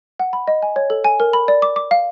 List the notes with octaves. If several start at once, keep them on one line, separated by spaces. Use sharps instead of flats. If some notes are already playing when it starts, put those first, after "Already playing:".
F#5
B5
D#5
G#5
C#5
A4
G#5
A#4
B5
D5
D6
D6
F5